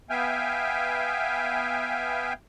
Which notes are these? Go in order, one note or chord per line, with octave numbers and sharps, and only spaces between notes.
B3 E5 F5 G5 G#5